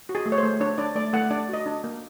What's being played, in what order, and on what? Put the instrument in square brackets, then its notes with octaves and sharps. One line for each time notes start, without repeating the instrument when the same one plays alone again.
[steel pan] F#4
G#4
A3
C#5
C5
A3
D4 C#5
D4 D5
A3 D5
A3 F#5
D4 D5
F#4 D#5
D4
A#3